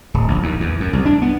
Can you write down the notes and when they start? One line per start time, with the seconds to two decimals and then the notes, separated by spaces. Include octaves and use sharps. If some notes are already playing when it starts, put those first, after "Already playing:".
0.14 D1
0.28 A#1
0.43 D#2
0.60 E2
0.80 F#2
0.93 C2
1.05 D4
1.22 B3